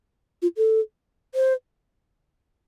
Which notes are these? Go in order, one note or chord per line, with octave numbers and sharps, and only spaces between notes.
F4
A4
C5